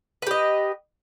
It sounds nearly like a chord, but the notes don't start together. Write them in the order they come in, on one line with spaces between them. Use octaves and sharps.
B4 G4 D#5